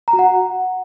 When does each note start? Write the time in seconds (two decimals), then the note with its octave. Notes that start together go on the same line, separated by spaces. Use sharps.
0.08 A#5
0.13 F#4
0.19 F#5